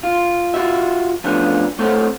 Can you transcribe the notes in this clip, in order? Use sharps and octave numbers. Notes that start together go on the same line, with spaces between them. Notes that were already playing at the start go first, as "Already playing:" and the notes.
F4
F4 F#4 E5
F3 A3 B3 C#4 D4 F4
A3 C4 A4 C#5 F5 F#5